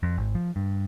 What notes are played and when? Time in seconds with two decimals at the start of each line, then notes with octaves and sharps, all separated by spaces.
0.03 F2
0.18 G#1
0.35 F3
0.56 G2